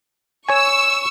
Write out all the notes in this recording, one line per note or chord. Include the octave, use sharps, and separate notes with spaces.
C#5 G#5 C#6 E6